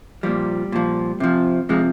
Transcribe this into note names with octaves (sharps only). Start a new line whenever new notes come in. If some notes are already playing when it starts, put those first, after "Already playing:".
A#2 F3 G3
A#2 F3
C3 F3
C3 F3 G#3